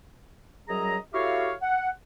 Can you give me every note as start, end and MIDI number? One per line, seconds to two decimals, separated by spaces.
0.69 0.97 42
0.69 0.97 54
0.69 0.97 55
0.69 0.97 68
0.69 0.97 75
0.69 0.97 82
1.14 1.52 64
1.14 1.52 66
1.14 1.52 67
1.14 1.52 69
1.14 1.52 73
1.14 1.52 77
1.62 1.89 78